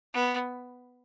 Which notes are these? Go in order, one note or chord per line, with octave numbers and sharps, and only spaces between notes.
B3